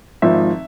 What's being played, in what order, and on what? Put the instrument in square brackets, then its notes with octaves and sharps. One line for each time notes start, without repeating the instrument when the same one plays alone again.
[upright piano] G#1 G#2 F3 E5